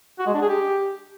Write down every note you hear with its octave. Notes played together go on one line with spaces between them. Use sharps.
F#4
G#3
D4
G#4
G4